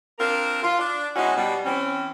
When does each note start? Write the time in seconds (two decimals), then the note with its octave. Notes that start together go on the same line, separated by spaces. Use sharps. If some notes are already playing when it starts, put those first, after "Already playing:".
0.19 C4 D4 F4 A#4
0.63 F4
0.79 D4
1.15 B2 G#3 C#4 D#4 E4 F#4
1.36 B2 G3
1.65 E3 C4 C#4